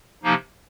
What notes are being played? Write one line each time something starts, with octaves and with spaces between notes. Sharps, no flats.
C3 F3 A#3 D#4